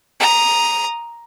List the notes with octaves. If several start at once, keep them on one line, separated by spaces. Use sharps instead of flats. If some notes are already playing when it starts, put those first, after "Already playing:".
A#5 D#6